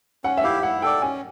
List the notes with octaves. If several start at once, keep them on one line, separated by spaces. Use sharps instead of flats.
C#4 F#5
E5
E4 G4 F5
E4 F#5
A4 D5 G5
C#4 G#5